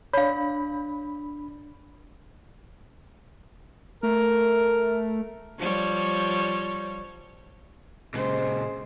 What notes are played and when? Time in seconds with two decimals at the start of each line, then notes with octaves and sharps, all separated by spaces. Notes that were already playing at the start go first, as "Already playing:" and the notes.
0.13 D4 C#5 F5 B5
4.03 A3 A#4
5.58 F3 G3 C#5
8.14 A#2 C#3 G#3 C5